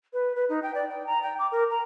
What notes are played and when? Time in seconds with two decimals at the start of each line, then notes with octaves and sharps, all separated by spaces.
0.13 B4
0.36 B4
0.49 D#4
0.63 G5
0.75 D5
0.90 G5
1.07 A#5
1.23 G5
1.39 D6
1.52 A#4
1.70 A#5